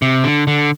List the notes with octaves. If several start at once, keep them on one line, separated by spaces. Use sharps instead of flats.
C3
D3
D3